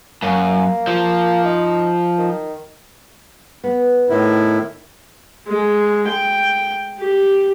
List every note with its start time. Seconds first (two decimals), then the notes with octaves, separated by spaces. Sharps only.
0.22 F#2 A#3
0.87 F3
1.45 D#4
2.18 D#3
3.64 B3
4.09 A2 D#3 E4
5.48 G#3
6.08 G5
7.00 G4